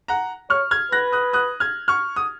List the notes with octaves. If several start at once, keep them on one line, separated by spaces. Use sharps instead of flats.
F#5 A#5
C#5 C#6 F6
F6 G#6
B4 F#6 A#6
D#6 F#6
D#6 F#6
F6 G#6
C#6 F6
D#6